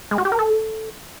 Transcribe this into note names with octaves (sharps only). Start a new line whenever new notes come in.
G#3
F#4
G4
A#4
A4